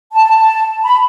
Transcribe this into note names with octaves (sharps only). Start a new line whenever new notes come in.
A5
B5